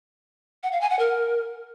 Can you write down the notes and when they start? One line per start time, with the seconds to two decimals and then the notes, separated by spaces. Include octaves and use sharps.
0.63 F#5
0.72 F5
0.81 G#5
0.90 F#5
0.99 A#4